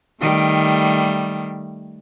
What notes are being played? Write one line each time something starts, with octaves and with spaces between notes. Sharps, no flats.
D#3 G3 A3